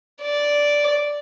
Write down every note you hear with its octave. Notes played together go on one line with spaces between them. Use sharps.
D5